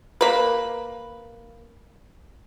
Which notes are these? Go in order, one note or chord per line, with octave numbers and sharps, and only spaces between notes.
A#3 B4